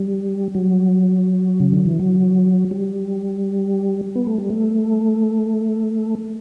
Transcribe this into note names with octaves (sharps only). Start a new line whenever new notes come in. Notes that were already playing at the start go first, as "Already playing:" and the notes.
Already playing: G3
F#3
C#3
D3
E3
F#3
G3
B3
A3
G3
A3